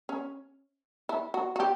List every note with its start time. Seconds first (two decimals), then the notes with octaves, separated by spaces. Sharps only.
0.09 C#4
1.09 E4
1.34 F#4
1.56 F#4
1.60 G4